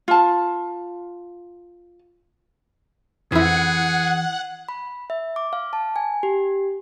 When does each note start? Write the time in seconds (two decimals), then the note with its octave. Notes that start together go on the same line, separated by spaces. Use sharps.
0.08 F4 A5
3.32 F2 E3 E4 G#4 F#5
4.69 B5
5.10 E5
5.36 D6
5.53 F5
5.73 A5
5.96 G#5
6.23 G4